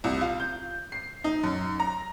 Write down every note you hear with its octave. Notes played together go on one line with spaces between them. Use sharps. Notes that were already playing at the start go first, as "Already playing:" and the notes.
C2
F4
G6
C7
D#4
F#2
A#5